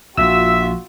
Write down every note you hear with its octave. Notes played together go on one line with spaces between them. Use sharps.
A#1 F4 F#4 E5 E6